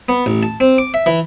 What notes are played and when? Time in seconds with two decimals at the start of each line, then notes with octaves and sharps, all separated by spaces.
0.09 B3
0.26 A1
0.43 A5
0.60 C4
0.78 D6
0.94 E5
1.06 E3